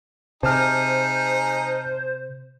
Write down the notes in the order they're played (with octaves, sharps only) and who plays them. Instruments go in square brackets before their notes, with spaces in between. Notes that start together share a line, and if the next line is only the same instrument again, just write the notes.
[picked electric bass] C3 [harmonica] D#4 G#4 [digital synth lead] C5 [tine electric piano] A5 F6